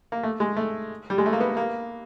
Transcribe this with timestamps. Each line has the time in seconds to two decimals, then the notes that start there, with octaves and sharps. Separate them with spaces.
0.12 A#3
0.23 A3
0.40 G#3
0.56 A3
1.10 G3
1.18 G#3
1.26 A3
1.33 A#3
1.40 B3
1.57 A#3